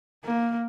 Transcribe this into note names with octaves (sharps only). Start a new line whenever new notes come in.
A#3